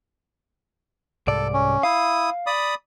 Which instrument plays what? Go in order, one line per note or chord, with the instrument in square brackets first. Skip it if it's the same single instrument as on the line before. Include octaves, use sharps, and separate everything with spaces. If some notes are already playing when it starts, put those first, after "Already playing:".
[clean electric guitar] C2 G#2 D5 [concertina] A4
[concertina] C#4
[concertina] E4 D#6 [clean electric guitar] F5
[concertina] D5 B5 D#6